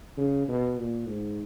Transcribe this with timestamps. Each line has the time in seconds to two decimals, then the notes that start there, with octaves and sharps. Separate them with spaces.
0.17 C#3
0.48 B2
0.78 A#2
1.08 G#2